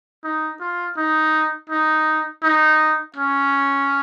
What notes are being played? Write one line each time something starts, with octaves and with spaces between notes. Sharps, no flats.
D#4
F4
D#4
D#4
D#4
C#4